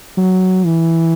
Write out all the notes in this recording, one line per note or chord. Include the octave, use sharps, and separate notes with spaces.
F#3
E3